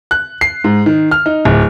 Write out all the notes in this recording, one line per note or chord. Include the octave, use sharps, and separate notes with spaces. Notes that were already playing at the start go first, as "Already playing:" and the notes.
F#6
C7
G#2
D#3
F6
D#4
D1